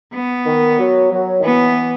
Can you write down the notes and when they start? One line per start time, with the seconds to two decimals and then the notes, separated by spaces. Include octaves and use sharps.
0.14 B3
0.46 D#3
0.79 F#3
1.11 F#3
1.38 D#3
1.43 E3 B3